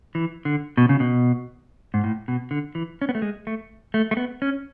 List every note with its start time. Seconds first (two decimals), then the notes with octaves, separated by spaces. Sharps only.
0.15 E3
0.45 D3
0.77 B2
0.89 C#3
1.00 B2
1.94 G#2
2.04 A2
2.28 B2
2.51 D3
2.75 E3
3.02 C#4
3.09 B3
3.15 A3
3.22 G#3
3.47 A3
3.94 A3
4.11 A3
4.17 B3
4.42 C#4